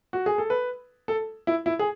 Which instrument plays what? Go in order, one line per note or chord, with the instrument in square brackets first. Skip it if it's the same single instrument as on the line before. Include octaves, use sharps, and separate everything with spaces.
[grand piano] F#4
G#4
A4
B4
A4
E4
E4
G#4